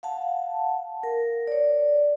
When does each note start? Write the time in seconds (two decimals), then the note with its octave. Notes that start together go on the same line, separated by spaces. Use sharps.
0.03 F5 F#5 A5
1.03 A#4
1.47 C#5 D5